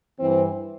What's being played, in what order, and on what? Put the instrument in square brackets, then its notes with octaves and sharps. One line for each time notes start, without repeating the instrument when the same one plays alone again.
[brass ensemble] G2 E3 C4